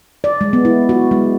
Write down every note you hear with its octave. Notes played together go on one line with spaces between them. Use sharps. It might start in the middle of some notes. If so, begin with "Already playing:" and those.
D5
G#3
B3
E4
F#4
G#3